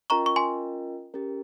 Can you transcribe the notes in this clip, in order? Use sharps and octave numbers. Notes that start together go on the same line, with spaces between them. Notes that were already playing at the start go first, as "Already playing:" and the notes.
C#4 F4 A#4 D#5 G5 A#5 C#6
C#6
G#5 C6
C#4 G4 A#4